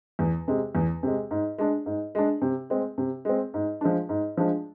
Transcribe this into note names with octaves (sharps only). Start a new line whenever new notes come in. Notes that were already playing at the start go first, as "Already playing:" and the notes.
E2
C3 G#3
E2
C3 G#3
G#2
G#3 D4
G#2
G#3 D4
C3
G#3 C4
C3
G#3 C4
G#2
F3 G#3 D4
G#2
F3 G#3 D4